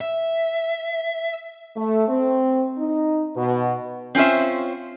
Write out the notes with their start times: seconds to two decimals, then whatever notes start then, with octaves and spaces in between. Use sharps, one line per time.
0.01 E5
1.76 A3
2.09 C4
2.78 D#4
3.36 B2
4.15 C4 C#4 F4 C5 E5